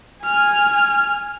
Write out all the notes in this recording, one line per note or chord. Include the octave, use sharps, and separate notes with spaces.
G#5 F6